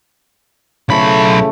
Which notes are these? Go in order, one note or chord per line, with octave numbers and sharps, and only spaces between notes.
B1 C#3 E3 A3 B5